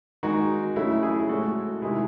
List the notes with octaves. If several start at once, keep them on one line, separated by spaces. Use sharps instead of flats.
D#3 G#3 D#4 F#4
C#3 F#3 A3 E4
E4 G#4
A2 G#3 F#4 A4
C3 D#3 G#3 E4 G#4